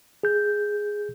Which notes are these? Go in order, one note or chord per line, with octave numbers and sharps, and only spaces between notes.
G#4 G6